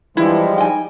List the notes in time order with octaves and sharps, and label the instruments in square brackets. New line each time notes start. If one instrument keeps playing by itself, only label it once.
[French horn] E3 [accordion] F3 G3 G#3 [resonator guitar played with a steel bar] E4
[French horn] D#4 [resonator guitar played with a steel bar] G5 G#5